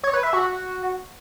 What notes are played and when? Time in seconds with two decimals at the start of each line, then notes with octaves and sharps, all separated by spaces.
0.03 C#5
0.13 B4
0.23 E5
0.33 F#4